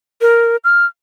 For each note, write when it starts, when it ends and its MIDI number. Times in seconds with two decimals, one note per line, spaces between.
0.21 0.57 70
0.64 0.86 89